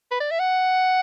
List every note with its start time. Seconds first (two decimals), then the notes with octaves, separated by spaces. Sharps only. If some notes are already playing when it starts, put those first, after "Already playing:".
0.11 B4
0.21 D5
0.31 E5
0.40 F#5